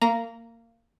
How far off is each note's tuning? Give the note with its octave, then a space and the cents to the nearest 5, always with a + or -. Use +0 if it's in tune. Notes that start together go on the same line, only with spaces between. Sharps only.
A#3 -20 A#5 +0